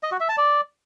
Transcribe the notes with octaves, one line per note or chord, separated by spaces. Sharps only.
D#5
F#4
E5
A5
D5